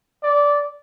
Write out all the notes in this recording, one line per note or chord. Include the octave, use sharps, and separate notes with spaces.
D5